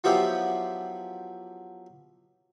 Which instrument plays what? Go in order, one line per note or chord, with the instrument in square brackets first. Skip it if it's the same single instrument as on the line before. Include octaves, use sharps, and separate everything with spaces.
[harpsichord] F3 F#3 B3 E4 F4 G4